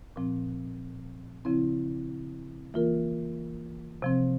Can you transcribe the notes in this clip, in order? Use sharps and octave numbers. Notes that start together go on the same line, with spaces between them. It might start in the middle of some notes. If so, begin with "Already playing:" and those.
A#2 F3 C4
C#3 F3 C4 E4
E3 A#3 F4 A#4
C3 F3 C4